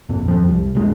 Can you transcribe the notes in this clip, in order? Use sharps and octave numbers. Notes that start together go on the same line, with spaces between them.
A#1 F2
F2 F3
C2
E1 A#1 G#3